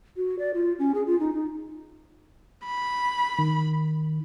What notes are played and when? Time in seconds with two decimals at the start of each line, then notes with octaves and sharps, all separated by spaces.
0.17 F#4
0.39 D5
0.54 F4
0.79 C#4
0.95 G#4
1.06 F4
1.20 D#4
1.34 D#4
2.65 B5
3.39 D#3